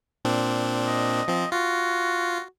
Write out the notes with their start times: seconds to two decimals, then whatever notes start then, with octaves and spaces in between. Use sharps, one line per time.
0.25 A#2 C4 D4
0.87 D#5
1.28 F3 C4
1.52 F4 F#4